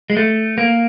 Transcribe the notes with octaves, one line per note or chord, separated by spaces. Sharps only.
G#3
A3
A#3